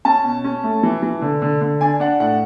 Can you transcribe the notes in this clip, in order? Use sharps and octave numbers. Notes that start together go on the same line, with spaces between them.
C#4 A5
B2
C#4
A3
E3
E3
D3
D3
D3
D4 G#5
D4 F#5
A2 F#5